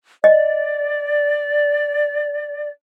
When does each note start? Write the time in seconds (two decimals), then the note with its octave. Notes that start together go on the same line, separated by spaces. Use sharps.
0.24 D5 D#5